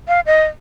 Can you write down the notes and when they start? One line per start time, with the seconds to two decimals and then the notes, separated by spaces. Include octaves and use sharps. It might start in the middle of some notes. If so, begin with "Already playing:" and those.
0.08 F5
0.26 D#5